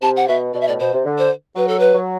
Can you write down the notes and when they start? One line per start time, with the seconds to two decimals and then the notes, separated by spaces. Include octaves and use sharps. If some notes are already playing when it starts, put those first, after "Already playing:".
0.02 C3 A5
0.16 F#5
0.28 B2 E5
0.54 B2 D5
0.61 E5
0.68 A2 D5
0.79 B2 C5
0.93 C3
1.05 D3
1.18 C5
1.56 F#3 B4
1.68 A4
1.79 B4
1.95 F#3